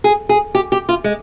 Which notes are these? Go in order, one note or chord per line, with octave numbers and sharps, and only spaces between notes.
G#4
G#4
G4
G4
F4
G#3